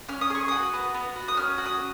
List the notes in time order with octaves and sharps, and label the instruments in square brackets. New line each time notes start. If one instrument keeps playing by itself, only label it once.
[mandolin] C#4 F6
D#6
G#4 C#6
F#4 D#6
B3
B3
F#4
D#6
C#4 F6
F#4
D#6